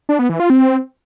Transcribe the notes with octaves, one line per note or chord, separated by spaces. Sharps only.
D4
B3
E3
F4
C4